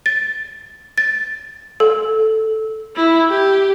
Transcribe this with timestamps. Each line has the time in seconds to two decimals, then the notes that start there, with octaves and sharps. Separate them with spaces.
0.06 A6
0.98 A6
1.80 A4
2.96 E4
3.30 G4